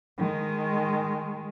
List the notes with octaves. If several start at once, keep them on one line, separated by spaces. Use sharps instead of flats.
D#3 G#3